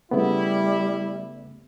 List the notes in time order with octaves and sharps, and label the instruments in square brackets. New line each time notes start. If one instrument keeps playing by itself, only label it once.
[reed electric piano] C#3 A3 B3 [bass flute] G3 [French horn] E4